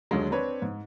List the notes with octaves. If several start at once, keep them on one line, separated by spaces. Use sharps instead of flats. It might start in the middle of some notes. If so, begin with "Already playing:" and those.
D#2 D3 F#3 G#3
C4 D4 B4 C#5
G#2